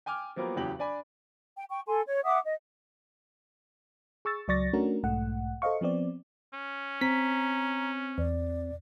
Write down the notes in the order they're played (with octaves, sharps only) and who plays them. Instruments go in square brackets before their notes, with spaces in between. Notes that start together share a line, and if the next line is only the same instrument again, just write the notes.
[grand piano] G5 G#5 D6 F6
F3 F#3 A#3 B3 G4 A#4
D1 E2 C#3 F#3 G4 F#7
D4 D5 G#5 B5
[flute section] G5
G5 C#6
A4 G#5 C6
C#5
E5 F#5 D6 D#6
D#5
[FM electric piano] G#4 C#6 E6 A6
C#2 F#3 D5 C#6 A6 A#6
A3 C#4 D4 F#4 A#4
B1 G#2 A3 F#5
A4 C5 D#5 F5 C#6
F3 B3 C4 D5
[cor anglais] C#4
[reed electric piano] C4 [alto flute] A#5 [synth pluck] B6
[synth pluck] E2 [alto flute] D5